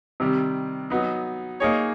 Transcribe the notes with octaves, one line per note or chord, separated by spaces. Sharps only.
C3 D#3 G3
F#3 B3 D#4
A#3 D#4 G#4 C#5